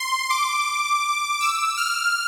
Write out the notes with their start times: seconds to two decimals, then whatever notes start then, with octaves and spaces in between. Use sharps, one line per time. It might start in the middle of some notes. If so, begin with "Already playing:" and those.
Already playing: C6
0.30 D6
1.41 E6
1.77 F6